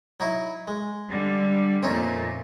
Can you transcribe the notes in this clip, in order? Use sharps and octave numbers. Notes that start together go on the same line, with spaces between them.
F#3 D#4 E4
G#3
D3 G3
F2 A#2 A3 C4 C#4 D#4